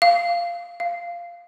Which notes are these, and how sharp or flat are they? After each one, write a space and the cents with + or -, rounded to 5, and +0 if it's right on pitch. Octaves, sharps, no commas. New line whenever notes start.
F5 -10
F5 -10